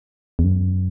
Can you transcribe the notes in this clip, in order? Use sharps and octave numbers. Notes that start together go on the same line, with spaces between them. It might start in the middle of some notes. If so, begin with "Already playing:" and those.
E2
F#2